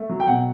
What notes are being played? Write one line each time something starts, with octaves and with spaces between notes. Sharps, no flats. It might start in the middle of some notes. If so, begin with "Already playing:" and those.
Already playing: A3
F#3
G5
B2 F#5